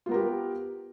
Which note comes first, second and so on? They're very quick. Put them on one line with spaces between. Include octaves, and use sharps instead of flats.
F4 B3 A#4 G4